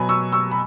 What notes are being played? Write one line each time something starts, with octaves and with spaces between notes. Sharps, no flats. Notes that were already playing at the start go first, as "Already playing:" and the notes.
Already playing: B2 F#3 G#5 B5
C#6 E6
C#6 E6
B5